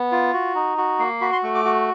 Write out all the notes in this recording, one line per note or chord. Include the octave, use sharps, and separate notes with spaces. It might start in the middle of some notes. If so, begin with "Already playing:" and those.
Already playing: B3
F4
F#4
D#4
F#4
A#3
F#4 B5
C6
A3 C#6
D6
F#4